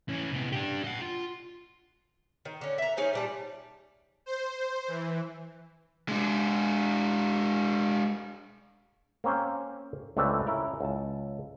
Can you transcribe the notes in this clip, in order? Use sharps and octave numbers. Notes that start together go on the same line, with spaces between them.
E3 C#4
C3 B3
D4 G4
D#5 F#5
F4
D#3
D3 C#4
E5 A#5
C#4 D#4 G#4 C5
A#2 G3 A5
C5
E3
G#3 D4
A#3 C4 C#4 A#4 C5
C#2 A3 C4 D4 B4 E5
C#4 E4 A#4
C#2 A5